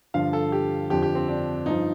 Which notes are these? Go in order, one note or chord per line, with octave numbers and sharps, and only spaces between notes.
G2 D3 F3 F5
A4
G4
F2 D3 F3 G4
G4
C4
D4
G2 F3 D#4